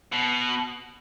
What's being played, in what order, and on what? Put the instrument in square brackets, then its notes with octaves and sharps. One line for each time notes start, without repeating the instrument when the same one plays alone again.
[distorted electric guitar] B2